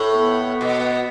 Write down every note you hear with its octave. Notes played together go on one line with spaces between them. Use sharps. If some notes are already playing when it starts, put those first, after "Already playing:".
Already playing: A2
B3
B2